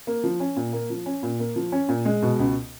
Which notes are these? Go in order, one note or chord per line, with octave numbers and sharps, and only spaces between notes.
A#3
F3
C#4
A#2
A#3
F3
C#4
A#2
A#3
F3
C#4
A#2
G#3
B2
C#2